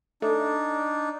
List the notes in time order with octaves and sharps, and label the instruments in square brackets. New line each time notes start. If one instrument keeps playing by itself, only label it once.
[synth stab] A3 [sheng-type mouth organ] D4 D#4